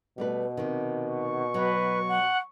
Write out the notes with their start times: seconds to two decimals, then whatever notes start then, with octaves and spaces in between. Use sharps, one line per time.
0.18 B2 G3 A3 B4
0.57 C3 D#3
1.07 C#6
1.54 F#3 B4
2.08 F#5